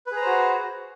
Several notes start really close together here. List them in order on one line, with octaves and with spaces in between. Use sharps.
B4 G#4 A#5 C5 F#4